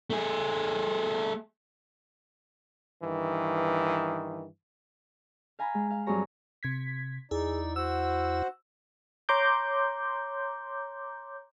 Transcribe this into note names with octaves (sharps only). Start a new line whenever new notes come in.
A3 G#4
G2 D#3 E3
F5 G#5 A#5 B5
G#3
F5
G2 F#3 C4 G#4 C#5 A#5
C3 G#6 B6
E2 D#4 E4 G#4 D5
F#4 C5 F#5 E6
C#5 A#5 C6 D6 G6